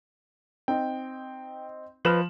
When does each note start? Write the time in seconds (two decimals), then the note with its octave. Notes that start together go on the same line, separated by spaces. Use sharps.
0.68 C4 D#4 G5
2.05 F3 B4 D#5 B5 F6 E7 F#7